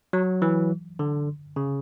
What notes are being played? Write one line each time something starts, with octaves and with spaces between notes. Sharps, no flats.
F#3
E3
D3
C#3